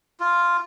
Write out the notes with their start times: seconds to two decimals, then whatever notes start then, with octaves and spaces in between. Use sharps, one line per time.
0.20 F4